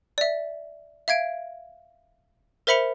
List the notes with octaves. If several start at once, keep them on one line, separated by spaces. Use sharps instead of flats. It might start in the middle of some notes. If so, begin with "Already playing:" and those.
D5 E5
E5 F5 G#6 D7
A#4 C5 E5 B5 C#7 F7